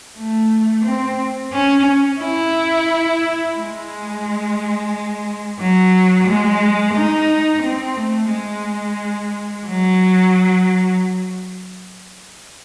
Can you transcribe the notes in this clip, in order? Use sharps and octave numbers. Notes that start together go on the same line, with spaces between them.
A3
C4
C#4
E4
G#3
F#3
G#3
D#4
C4
A3
G#3
F#3